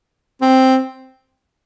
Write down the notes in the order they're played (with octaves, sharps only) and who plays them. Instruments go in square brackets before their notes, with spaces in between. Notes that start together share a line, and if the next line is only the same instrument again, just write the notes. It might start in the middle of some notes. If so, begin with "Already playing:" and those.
[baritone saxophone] C4